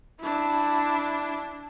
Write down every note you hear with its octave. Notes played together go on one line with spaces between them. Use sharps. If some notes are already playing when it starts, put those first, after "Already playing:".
D4 E4